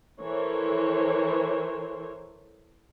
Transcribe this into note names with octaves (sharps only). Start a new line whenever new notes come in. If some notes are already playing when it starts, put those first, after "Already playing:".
E3 A4 A#4 C5 C#5